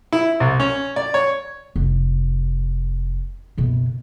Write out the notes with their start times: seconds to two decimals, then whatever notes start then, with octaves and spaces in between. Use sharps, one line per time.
0.13 E4
0.40 C2
0.60 C#4
0.96 D5
1.14 C#5
1.76 F1
3.58 F#1 B2